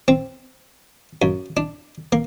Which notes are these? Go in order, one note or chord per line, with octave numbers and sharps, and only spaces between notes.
C4
F#2
D4
A#3